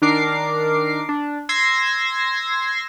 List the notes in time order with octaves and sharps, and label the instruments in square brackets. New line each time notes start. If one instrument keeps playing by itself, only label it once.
[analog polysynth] D#3 D4 A#4 D6 C7
D4
C6 E6 G#6 A#6 C7